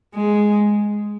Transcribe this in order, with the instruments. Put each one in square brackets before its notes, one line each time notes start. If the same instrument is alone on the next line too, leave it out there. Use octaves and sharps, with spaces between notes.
[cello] G#3